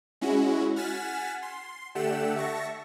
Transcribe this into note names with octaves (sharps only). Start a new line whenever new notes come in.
G#3 C#4 E4 F#4
F#5 G#5 F6 A6 B6 E7
C6
D3 A3 G4 F#5 E6 E7
E5 A5 C#6 A#6